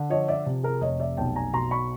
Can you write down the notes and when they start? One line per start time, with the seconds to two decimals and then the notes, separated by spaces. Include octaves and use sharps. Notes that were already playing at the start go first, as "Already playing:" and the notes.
Already playing: D3
0.10 F3 C#5 D#5
0.28 D5 E5
0.46 C3
0.63 G#4 A#4
0.81 F1 C#5 D#5
1.00 D5 E5
1.17 B1 G5 A5
1.36 G#5 A#5
1.54 B2 A#5 C6
1.71 B5 C#6